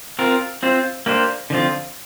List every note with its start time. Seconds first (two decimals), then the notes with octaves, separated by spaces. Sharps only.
0.19 C4 F4 A#4
0.63 C4 F4 C5
1.06 A#3 D4 G4 C5
1.50 D3 F3 C4 F4